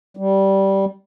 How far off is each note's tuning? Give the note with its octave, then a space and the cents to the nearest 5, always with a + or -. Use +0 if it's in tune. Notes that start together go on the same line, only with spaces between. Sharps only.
G3 -10